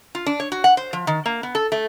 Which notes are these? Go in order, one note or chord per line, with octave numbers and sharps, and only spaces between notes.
F4
D4
C#5
F#4
F#5
C5
F3
D#3
A#3
B3
A4
A3